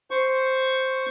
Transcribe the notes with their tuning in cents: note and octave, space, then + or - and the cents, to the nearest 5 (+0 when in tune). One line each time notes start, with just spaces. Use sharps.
C5 +0 C#6 +0